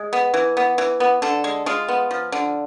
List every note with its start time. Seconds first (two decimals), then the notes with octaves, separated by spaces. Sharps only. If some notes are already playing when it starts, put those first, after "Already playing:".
Already playing: G#3
0.13 B3
0.34 E3
0.57 B3
0.78 E3
1.00 B3
1.22 D3 A4
1.44 G#3
1.66 G#3 F4
1.88 B3
2.11 F3
2.32 D3